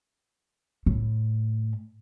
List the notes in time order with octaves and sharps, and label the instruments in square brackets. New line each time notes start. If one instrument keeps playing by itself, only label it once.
[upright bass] A2